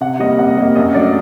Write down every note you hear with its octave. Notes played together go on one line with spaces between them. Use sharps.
C3 F#5
G3 A#3 D#5
C3 F#5
G3 A#3 D#5
F#2 D#5
F#3 A3 D4 D5